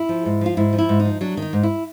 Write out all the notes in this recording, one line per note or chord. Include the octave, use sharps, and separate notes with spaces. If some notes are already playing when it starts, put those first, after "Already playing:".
Already playing: E4
F3
G#2
F3 F4
G#2 E4
F3
E4
G#2
D#4
F3
F#3 D4
D#3 D#4
G#2
E4